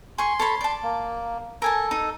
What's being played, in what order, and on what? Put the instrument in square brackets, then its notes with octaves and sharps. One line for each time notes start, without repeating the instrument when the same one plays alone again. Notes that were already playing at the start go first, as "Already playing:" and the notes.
[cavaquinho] G#4 C#6 [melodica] C6
[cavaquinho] A4 C#5 B5
D5 A5
[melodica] A#3
[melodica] A4 [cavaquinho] A#4 G#5 A5
[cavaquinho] D#4